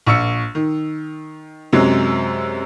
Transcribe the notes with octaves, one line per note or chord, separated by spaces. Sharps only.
A#1 C#6 E6 C#7
D#3
F#2 C3 F#3 G#3